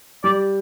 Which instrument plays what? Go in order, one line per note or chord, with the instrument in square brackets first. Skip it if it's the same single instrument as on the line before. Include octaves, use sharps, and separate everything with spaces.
[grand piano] G3 [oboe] D5